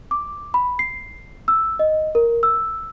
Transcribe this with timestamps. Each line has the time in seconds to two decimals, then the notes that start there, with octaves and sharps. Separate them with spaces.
0.11 D6
0.54 B5
0.79 C7
1.48 E6
1.79 D#5
2.15 A#4
2.43 E6